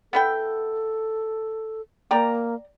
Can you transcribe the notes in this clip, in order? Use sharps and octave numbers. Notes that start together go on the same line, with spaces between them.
B3 E4 A4 G5
A#3 D5 G5 A#5